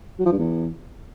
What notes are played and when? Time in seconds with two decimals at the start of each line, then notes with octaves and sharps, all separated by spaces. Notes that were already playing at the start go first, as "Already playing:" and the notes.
0.19 F#3
0.26 F3
0.32 G2
0.38 E2